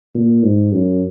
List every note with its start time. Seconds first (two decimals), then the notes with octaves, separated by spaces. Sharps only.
0.15 A#2
0.43 G#2
0.72 F#2